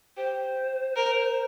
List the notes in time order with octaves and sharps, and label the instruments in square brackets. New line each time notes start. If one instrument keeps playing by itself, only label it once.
[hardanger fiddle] G4 [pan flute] C5
[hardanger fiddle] A#4